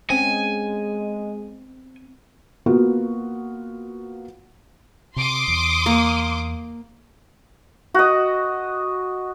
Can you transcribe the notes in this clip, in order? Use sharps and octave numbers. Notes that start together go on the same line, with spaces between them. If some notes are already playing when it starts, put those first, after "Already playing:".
G#3 C4 C#4 G#5
A#3 B3 F4 F#4
C3 C6 D6 D#6
E2
A#3
F#4 D#5